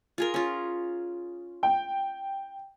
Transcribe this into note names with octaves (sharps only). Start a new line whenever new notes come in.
F4 G#4 A#4
C#4 F4
G5